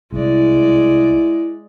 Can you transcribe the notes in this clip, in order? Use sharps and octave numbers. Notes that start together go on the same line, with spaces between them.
C2 G#3 E4 D5